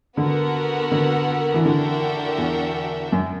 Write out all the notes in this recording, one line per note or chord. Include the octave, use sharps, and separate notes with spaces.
D3 B3 F#4 A#4
D3
E3
D3 D4 F#4 A#4 E5 G5
E2
F#2